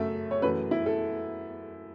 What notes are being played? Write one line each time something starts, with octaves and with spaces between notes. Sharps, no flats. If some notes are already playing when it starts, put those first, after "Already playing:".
Already playing: F#2 C#3 A3 E5
C#5
F#2 E3 A3 B4
E4
A4